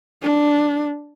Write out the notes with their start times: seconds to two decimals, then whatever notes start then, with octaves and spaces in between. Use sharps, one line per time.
0.23 D4